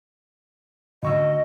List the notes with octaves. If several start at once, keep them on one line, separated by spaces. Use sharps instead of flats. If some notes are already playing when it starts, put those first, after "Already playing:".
D2 D#5 C#6 E6